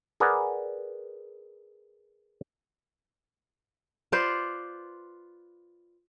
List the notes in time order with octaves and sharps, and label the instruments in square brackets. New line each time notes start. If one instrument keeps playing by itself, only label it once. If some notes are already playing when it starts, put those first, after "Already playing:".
[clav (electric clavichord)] G#4 A#4 B4 D5 F#5
[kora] F4 B4 C5 D5